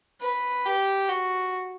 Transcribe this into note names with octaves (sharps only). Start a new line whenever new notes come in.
B4
G4
F#4